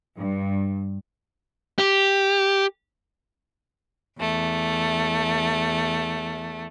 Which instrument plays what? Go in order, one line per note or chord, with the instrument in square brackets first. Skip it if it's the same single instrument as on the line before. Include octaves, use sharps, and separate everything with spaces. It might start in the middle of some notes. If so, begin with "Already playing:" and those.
[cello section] G2
[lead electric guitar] G4
[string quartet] E2 A3